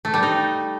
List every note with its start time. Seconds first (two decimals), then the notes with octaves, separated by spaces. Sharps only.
0.05 A3
0.14 G3
0.23 D#4